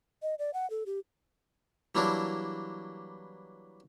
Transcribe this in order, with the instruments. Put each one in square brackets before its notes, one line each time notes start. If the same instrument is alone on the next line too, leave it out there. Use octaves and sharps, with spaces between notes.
[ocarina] D#5
D5
F#5
A4
G4
[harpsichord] E3 F#3 G3 A#3 D4 E4